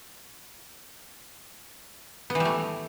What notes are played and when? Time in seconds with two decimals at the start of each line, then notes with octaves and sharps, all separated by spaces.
2.30 B3
2.35 E3
2.40 G3
2.45 A3